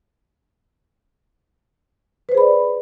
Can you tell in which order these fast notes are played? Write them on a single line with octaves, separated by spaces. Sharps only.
B4 C5 G#4 B5 D5